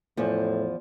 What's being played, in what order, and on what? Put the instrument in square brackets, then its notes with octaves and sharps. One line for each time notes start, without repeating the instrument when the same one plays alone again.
[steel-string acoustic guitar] E2 F3 [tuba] A2